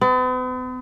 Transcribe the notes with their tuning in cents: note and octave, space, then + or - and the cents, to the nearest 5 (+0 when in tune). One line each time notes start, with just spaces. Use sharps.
B3 +45